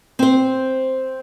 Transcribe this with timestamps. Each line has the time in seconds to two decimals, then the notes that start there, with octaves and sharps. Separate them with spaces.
0.19 C4 C5